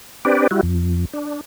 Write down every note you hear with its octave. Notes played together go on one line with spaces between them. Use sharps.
C4 D4 G4 B4 D5
G3 E4 F#4
F2
D4